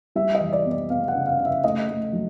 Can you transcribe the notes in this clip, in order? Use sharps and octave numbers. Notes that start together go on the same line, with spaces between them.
G3 E5
D#5
E3
D5
B3
D5
B3 F5
F#5
C#3
F5
C#3
E5
A3 D#5
A3
F#3